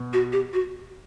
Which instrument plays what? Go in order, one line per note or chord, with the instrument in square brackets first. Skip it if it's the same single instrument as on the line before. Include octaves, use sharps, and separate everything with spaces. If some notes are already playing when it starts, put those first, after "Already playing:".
Already playing: [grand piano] B2
[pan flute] F#4
G4
F#4